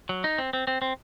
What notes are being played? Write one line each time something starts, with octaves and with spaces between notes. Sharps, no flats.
F#3
D#4
C4
C4
C4
C4